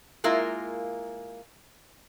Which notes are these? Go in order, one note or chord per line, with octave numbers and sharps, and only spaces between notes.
G#3 A#3 E4 F4 A#4